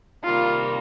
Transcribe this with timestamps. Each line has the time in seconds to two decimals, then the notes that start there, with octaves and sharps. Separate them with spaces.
0.24 C3 D#3 G3 A#3 F4